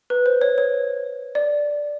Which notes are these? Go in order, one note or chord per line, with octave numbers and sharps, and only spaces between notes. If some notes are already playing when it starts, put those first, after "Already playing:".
B4
C5
C#5
C#5
D5